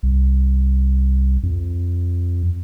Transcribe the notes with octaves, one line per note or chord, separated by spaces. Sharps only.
C2
F2